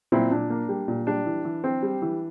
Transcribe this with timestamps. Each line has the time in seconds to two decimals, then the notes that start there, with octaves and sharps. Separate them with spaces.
0.12 A#2 C4 E4
0.31 A#2 D4
0.50 A#3
0.69 G3
0.88 A#2
1.07 G3 D4
1.26 E3
1.45 E3
1.64 C4
1.83 G3
2.02 E3